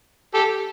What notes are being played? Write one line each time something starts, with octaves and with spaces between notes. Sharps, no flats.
G4 A4